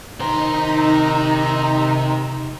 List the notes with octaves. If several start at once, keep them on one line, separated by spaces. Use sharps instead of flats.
C3 D#3 D#4 C5 A#5